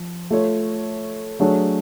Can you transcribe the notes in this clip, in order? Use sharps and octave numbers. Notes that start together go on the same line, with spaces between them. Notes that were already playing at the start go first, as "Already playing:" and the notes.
Already playing: F3
A3 F4 A4 C#5
F#3 A3 D4 G#4 C#5